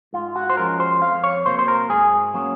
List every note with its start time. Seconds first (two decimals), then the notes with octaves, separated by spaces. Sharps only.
0.13 G#2 F4
0.36 F#4
0.49 C5
0.57 F3 G#3 C#4 A#4
0.80 C5
1.01 F2 F5
1.24 C#5
1.46 C3 F#3 A#3 C5
1.59 C5
1.68 A#4
1.89 G#2 G#4
2.34 F#3 A#3 C#4